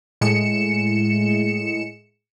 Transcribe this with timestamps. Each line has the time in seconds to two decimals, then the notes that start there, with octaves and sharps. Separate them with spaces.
0.21 A2 G#3 C#7 E7